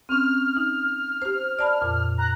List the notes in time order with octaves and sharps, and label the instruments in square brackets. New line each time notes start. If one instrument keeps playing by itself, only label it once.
[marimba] C4 C#4 [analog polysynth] F6
[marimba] D#4
G4 C5
D5 A5 B5
F2 A#2
[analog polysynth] A#5 F#6